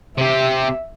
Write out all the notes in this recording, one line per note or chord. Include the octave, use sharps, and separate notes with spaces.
C3 G4 E5